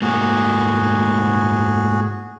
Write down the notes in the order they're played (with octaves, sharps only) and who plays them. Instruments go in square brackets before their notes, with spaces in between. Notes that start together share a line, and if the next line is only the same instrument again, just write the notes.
[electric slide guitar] G#2 A3 A#3 [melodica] F#4 G#4